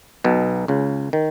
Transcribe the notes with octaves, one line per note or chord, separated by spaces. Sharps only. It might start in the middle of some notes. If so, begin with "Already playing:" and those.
B1 B2
C#2 C#3
D#3